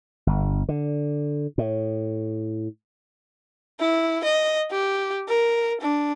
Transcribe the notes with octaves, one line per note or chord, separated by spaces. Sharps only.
G1
D3
A2
E4
D#5
G4
A#4
D4